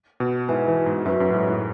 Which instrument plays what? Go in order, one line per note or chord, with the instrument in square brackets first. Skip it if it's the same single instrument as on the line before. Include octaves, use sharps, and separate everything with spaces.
[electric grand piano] B2
[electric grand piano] G#2 [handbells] E4 B4 E5 G#5
[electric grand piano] E3
G#2
[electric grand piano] F#2 [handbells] F#4 B4 E5
[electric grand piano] F#2
A2
G#2
A2